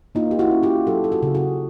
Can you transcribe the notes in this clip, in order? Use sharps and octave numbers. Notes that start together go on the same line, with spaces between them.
A#3 D#4 F4
G4
E4 F#4
C#4
F4 G4
F#3 G4 A4
A4
F#4 G#4
C#3
F#4 G#4